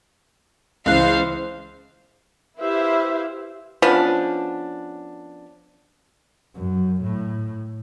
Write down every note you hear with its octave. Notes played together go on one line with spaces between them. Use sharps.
C#2 E3 C5 F5 F#6
E4 G4 B4 C5 E5 F5
F3 B3 C#4 D4
F#2
A2